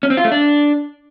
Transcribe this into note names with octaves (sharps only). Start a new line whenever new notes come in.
C#4
C4
F4
A3
D4